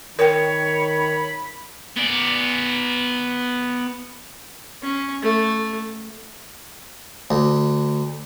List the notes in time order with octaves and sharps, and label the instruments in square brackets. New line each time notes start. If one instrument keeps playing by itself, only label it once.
[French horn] D#3 [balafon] A#4 G5 [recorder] C#5 [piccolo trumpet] B5
[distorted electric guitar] B3 D5
[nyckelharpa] C#4
A3
[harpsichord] D2